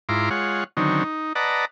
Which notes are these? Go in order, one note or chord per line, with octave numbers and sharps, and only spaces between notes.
G#2 E4 F4 A#5 C6 D6
G#3 F4 C#5 F#5
D3 D#3 F#3 C4 C#4 D#4
D#4
B4 D5 D#5 F#5 A5 A#5